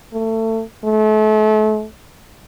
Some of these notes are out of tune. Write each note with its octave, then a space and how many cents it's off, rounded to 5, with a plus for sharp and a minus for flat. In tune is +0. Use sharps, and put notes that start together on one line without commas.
A3 +25
A3 -35